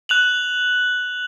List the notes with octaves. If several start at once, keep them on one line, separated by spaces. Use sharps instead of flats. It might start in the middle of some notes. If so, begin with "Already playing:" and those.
F#6 F7 F#7